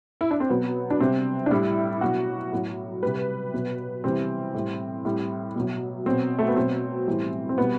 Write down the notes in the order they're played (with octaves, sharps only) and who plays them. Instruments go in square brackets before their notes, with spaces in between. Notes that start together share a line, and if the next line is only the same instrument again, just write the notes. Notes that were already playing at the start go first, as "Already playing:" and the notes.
[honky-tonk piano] E4
D4
C4
B2 F#3 B3
D4
C3 G3 C4
D4
A2 G3 E4
B2 F#3 F#4
A2 F#3
C3 G3 B4
B2 F#3
C3 E3 G3 C4
A2 G3
A2 G3
B2 F#3
B2 F#3 C4
A3
B3
B2 F#3 C4
A2 E3 G3
C4
B2 G3 B3